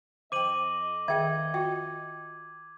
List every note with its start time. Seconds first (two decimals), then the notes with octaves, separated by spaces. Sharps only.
0.32 F2 C5 D#5 G5 D6 D#7 F#7
1.08 D#3 G#4 E5 F5 G5 G#6
1.54 F4 F#4 G5